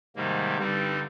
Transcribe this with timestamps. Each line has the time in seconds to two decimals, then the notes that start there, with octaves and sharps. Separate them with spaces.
0.15 G#2 C3 D#3 G3 A#3
0.58 G2 D3 G3 C4 D#4